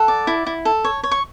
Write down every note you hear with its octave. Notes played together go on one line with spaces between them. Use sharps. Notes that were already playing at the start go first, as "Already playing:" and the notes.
Already playing: A4 F#5
D5
E4
E4
A4
C#5
C#5
C#6